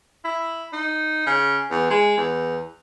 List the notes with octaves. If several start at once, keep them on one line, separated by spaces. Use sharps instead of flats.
E4
D#4
C#3
E2
G#3
E2